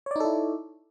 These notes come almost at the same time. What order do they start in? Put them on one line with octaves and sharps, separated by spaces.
C#5 D5 D#4 A4 E4